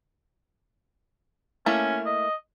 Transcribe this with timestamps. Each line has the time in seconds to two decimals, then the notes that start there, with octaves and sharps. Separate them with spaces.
1.66 A3 A#3 C#4 E4
2.06 D#5